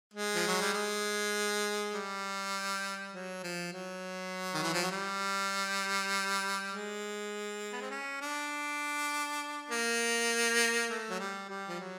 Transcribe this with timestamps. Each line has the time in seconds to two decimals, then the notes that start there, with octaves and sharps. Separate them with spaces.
0.14 G#3
0.35 F3
0.48 F#3
0.61 G3
0.74 G#3
1.93 G3
3.13 F#3
3.43 F3
3.73 F#3
4.54 D#3
4.63 E3
4.73 F3
4.82 F#3
4.92 G3
6.72 G#3
7.73 B3
7.82 C4
7.90 C#4
8.21 D4
9.71 A#3
10.90 A3
11.10 F#3
11.19 G3
11.49 G3
11.69 F3
11.80 F#3